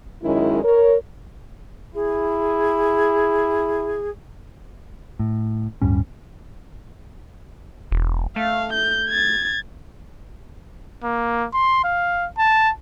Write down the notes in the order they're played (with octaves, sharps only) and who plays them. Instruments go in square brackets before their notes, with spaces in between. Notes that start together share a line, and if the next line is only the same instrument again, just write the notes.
[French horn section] F#2 D#3 G#3 C#4 E4
A#4 C#5
[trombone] E4 [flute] G#4
[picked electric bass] A2
D1 G2 G3 C#4
[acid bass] E1
[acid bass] A3 [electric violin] F5
[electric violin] G6
G#6 A6
[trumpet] A#3
C6
F5
A5